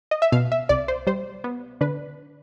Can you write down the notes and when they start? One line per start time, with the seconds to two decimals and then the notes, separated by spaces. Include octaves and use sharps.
0.11 D#5
0.22 E5
0.32 B2 F5
0.52 E5
0.69 C2 D5
0.88 C5
1.07 G3 C5
1.44 B3
1.81 D3 B4